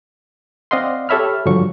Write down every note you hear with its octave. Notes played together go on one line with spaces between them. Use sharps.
C4 D5 D#5 F5 F#5 C6
G4 A4 C#5 E5 B5 F6
G2 D3 F3 F#3 C#6